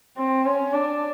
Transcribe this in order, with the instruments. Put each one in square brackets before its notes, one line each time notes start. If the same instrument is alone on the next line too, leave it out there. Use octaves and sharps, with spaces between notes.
[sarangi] C4
C#4
D4